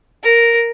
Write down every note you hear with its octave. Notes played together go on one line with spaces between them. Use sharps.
A#4